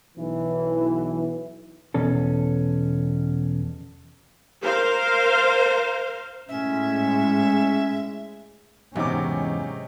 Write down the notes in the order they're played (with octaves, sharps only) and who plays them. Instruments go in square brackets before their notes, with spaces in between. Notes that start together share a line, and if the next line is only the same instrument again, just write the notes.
[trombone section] B1 E3
[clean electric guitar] E2 B2 C#4 A4
[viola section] A#4 C5 F5
[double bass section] A2 G#3 [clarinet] C#4 [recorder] E5
[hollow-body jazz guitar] E2 [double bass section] G#2 C#4 [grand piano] C3 D6 [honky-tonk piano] F#3 D#4